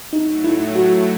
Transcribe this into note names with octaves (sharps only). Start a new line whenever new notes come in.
A2 F#3 A3 D#4
E4
F#4